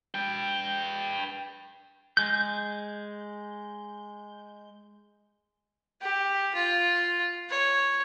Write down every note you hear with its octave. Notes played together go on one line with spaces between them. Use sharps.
B4 G5
G#3 G6
G4
F4
C#5